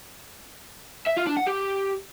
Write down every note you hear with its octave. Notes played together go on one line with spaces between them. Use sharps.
E5
F4
D4
F#5
G4